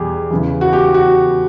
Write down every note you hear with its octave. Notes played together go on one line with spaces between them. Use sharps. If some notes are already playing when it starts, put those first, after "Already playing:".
Already playing: E2 B2 G3 G4 G#4
E2 C#3 E3
F#4
G4
F#4